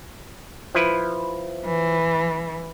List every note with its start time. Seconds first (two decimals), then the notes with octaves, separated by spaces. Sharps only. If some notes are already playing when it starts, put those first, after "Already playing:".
0.75 F3 E4 B4
1.65 E3